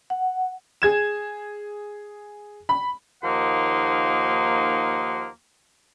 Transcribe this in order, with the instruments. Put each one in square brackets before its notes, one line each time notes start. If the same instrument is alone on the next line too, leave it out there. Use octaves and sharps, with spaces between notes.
[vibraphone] F#5
[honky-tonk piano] G#4 G#6 E7
B5
[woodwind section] D#2 F3 A#3 D#4 F#5 C6